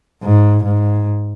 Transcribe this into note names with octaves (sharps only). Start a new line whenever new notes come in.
G#2
G#2